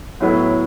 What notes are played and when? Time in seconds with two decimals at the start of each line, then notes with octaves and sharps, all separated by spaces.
0.20 A2 F#3 B3 E4